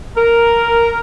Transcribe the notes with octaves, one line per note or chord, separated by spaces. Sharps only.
A#4